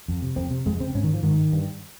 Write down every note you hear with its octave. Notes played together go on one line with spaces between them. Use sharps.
F2
C3
F2 C4
C3
F2 G#3
C#3 C4
G#2 C#4
D#3
F3
G#2 D#3
G2